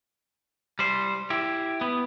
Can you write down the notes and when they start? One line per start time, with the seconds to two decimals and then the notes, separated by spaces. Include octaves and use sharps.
0.79 G3 C5
1.30 E4 G4
1.81 B3